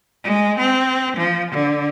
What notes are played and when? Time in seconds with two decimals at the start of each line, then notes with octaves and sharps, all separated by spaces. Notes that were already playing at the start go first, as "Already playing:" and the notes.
0.24 G#3
0.59 C4
1.17 F3
1.52 D3